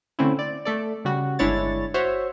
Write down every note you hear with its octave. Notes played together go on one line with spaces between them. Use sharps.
D3 A3 C4 C#4 E4
D5
A3 A4 D5
C#3 G3 F#4
G1 G#3 D4 E4 C#5 A6
F#4 C5 C#5 E5